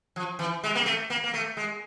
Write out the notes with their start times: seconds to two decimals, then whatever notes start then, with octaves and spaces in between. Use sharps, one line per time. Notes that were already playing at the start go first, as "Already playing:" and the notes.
0.16 F3
0.39 E3
0.64 G#3
0.75 A#3
0.86 A3
1.10 A#3
1.24 A#3
1.34 A3
1.57 G#3